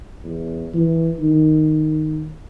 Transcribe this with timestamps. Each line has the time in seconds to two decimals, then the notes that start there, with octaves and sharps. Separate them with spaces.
0.24 E2
0.74 E3
1.20 D#3